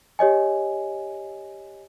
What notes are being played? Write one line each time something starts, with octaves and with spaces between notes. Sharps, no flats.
G4 C#5 D#5 G#5